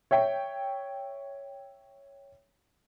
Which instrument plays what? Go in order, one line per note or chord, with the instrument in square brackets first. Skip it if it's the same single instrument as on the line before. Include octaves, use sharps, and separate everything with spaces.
[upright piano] C#5 E5 G5